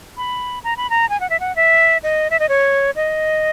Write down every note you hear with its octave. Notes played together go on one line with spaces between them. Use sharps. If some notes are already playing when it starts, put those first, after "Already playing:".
B5
A#5
B5
A#5
G#5
F#5
E5
F#5
E5
D#5
E5
D#5
C#5
D#5